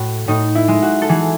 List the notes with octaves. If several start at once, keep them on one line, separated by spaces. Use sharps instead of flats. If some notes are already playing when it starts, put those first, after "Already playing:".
Already playing: A2 F#4
A2 D#4
E4
G#3
F#4
A4
E3 G#4